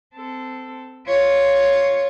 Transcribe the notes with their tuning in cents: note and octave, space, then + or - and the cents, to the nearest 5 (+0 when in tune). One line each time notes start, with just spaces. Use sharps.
C4 -20 A4 +0
F4 +0 C#5 +0